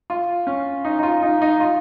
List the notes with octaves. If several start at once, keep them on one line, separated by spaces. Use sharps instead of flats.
F4
C#4
D#4
D#4
F4
D#4
D#4
F4